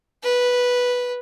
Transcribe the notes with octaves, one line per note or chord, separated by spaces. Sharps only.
B4